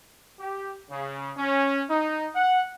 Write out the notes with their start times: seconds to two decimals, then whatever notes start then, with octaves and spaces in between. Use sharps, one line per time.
0.39 G4
0.90 C#3
1.37 C#4
1.89 D#4
2.35 F#5